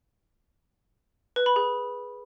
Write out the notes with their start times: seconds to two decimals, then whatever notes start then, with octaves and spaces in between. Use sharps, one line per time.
1.36 B4
1.46 B5
1.56 G#4